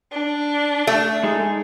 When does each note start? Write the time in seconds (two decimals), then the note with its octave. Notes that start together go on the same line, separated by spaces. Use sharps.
0.11 D4
0.87 A3
1.23 G#3 D#4 G#4